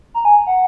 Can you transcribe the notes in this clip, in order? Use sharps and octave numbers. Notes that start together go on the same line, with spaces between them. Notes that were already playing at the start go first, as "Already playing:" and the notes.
A#5
G#5
F#5